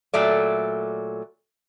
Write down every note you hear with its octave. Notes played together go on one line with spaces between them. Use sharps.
A#2 F#3 A3 D5